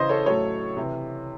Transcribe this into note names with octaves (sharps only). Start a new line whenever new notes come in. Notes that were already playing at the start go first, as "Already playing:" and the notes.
Already playing: C#3 E3 C5 D#5
A4 C#5
A2 F#3 A4 C#5
C3 E3